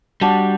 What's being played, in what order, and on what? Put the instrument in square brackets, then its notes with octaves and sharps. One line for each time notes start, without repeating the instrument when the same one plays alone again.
[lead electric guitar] G3 [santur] D4 F#4